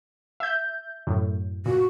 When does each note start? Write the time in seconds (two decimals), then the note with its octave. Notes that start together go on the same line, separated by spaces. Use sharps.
0.40 E5 G6
1.07 F#2 A2
1.66 A#2 F#4